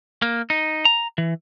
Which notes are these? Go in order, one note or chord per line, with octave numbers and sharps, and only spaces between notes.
A#3
D#4
A#5
E3